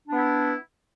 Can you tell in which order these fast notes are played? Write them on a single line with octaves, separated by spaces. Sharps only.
D4 B3 E4